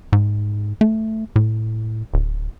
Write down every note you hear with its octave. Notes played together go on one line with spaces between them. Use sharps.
G#2
A3
A2
D1